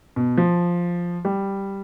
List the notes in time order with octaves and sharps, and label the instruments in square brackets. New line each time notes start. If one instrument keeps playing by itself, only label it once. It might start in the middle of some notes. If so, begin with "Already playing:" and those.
[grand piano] B2
F3
G3